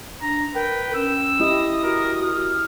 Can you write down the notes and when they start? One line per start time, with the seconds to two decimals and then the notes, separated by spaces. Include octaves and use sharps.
0.22 D4 A#5
0.54 A#4 B4 G5
0.95 C#4 E6
1.40 E4 G4 D#5 D#6
1.84 F#4 A#4
2.25 F6